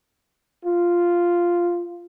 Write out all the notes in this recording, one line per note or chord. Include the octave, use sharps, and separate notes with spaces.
F4